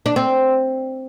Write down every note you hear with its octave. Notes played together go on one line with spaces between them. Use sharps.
D4
C4